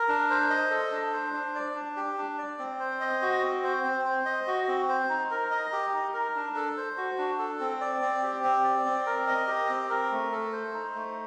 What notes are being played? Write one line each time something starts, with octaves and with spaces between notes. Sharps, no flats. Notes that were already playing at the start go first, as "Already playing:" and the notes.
Already playing: A#4
D4
C5
D#5
A4
D4
C5
D4
D5
D4
G4
D4
D5
C4
C5
D#5
F#4
C4
C5
C4
C5
D#5
F#4
C4
C5
D#4
A#4
D#5
G4
D#4
A#4
D4
A4
C5
F#4
D4
A4
C4
D5
C4
G4
C4
D5
C4
A#4
D#5
G4
C4
A#4
A3
A4
C5
D#4
A3